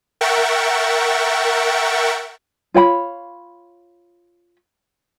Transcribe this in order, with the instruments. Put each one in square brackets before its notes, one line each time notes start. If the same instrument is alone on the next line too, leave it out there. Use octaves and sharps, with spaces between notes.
[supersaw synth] A#4 E5 F#5 G5 C#6 A6
[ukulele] F4 C#5 G5 B5